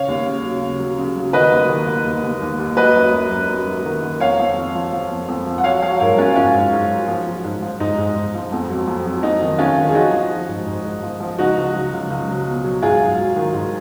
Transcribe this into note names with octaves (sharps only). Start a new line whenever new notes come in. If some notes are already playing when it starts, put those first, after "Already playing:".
Already playing: C#3 C#5 F5
D#2
C#3
F#3
C#3
F#3
C#3
F#3
D#3 B4 D#5
D#2
D#3
D#3
D#2
D#2
D#2
D#2
F#3 B4 D#5
F#2
F#2
F#2
F#2
F#3
D#3
D#3
F2 C#5 F5
F2
F3
F3
F3
F2
F2
F3
F#5
F#3 C#5 F5
F#3 C#5 F5
G#2 A#4 C#5
F#3 C#4 F4
G#2 C#4 F4
G#2
G#2
F#3
F3
F3
G#2
F3
G#2 D#4
G#2
G#2
F3
F2
F#3
F2
F#3
F2 D#4
D#3
D#3 C#4 F4
D#3
G#4
F3 D#4 F#4
F3
F3
G#2
G#2
G#2
F3
F3
C#2 D#4 F#4
C#2
F#3
C#2
C#2
F#3
B2
F#3
G#2 F4 G#4
G#2
F#3
D#3
G#2